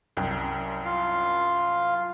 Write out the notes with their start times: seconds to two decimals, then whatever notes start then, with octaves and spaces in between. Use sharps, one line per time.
0.17 C2 F#2 G5
0.85 F4 F5